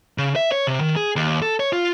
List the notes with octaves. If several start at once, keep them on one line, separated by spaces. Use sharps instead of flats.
C#3
E5
C#5
C3
D#3
G#4
D#2
A4
C#5
F4